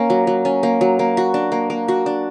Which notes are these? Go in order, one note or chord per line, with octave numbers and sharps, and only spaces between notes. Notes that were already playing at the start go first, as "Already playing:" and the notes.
Already playing: A#3 C#4
F#3
F#3
C#4
A#3
F#3
A#3
F#4
D4
A#3
A#3
F#4
D4